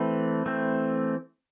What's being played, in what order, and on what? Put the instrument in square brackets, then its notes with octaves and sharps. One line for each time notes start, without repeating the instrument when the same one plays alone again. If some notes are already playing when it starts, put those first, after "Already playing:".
Already playing: [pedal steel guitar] E3 A3 C4 B4
E3 A3 C4